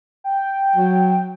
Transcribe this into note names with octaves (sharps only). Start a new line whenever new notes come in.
G5
F#3